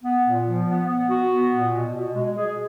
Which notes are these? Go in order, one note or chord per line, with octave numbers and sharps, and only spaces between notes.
B3
A#2
F3
B3
B3
F#4
B3
A#2
B2
B2
G#3
G#4